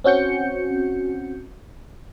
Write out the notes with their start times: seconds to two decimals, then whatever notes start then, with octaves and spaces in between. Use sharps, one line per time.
0.04 C4 C#4 F#4 G6 C#7